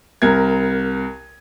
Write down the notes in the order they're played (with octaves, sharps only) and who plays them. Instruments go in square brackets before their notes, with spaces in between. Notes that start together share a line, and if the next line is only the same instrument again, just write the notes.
[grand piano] C2 A#4 G#6